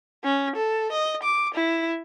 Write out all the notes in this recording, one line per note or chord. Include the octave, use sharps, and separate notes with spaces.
C#4
A4
D#5
D6
E4